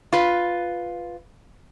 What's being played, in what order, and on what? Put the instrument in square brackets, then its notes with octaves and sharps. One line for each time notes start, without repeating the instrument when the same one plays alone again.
[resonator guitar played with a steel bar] F4 B4